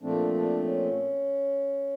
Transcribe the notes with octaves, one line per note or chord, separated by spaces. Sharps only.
A#2 F3 A3 C4 D4
D4
C#4